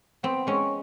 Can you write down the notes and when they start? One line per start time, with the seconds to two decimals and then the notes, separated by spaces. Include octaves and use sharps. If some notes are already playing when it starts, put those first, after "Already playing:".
0.23 B3 C4
0.47 G#3 C#4